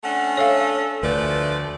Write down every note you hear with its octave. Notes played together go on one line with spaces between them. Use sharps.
A3 C#4 D4 F#5
A4 C#5 E5 F5
D2 F3 A3 B4 D5